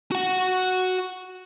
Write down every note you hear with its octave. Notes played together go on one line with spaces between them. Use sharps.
F#4 F#5